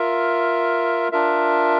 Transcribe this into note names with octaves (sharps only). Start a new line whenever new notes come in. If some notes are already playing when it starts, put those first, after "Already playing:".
Already playing: F4 A#4 E5
D4 F4 A#4 E5